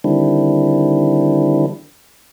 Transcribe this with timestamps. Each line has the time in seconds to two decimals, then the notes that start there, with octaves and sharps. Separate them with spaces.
0.04 D3 D#3 G3 C4 D4 E4